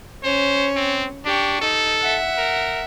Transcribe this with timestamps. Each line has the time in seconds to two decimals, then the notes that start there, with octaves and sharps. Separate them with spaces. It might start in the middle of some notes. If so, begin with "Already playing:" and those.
0.24 C#4 C5 C#5
0.76 C4
1.26 D4 G4 C#6
1.61 D#4 A4
2.00 E5 F#5
2.38 A#4